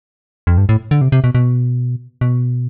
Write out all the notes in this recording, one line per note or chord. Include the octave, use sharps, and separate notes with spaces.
F2
G2
A2
D3
C3
C3
B2
B2
B2